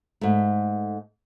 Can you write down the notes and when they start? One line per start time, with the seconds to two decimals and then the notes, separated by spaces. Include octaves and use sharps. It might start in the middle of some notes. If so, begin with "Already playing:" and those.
0.21 G#2 A3